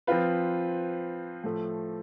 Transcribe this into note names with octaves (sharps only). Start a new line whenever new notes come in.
F3 C4 F4 B4
A2 F3 A3